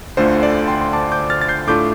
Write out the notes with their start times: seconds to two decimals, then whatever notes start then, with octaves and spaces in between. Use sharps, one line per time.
0.17 D2 D3 A3 D4 F4 C5
0.43 D5
0.68 G5 C6
0.81 C6
0.93 A5 D6
1.12 D6 G6
1.30 F6 A6
1.41 A6
1.48 G6 C7
1.67 A2 A3 D4 F4 D6 G6